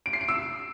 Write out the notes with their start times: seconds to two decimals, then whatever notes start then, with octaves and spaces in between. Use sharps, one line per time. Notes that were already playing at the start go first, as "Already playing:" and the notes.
0.06 D7
0.13 C7
0.21 D7
0.29 E6